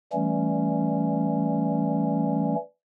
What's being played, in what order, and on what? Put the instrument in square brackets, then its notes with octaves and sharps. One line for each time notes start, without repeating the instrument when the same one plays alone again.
[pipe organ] E3 G3 A3 C#4